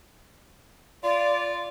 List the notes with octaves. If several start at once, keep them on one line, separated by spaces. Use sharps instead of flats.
F4 D5